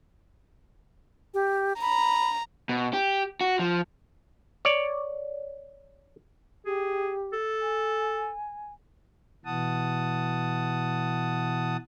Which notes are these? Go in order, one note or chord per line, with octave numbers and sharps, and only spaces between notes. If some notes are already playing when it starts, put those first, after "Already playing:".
G4
A#5 B5
B2
G4
F#4
F3
C#5 D5
G4 G#4
A4
G#5
B2 E3 F#5 A5 D#6